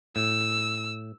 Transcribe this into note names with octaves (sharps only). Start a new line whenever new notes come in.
A2 E6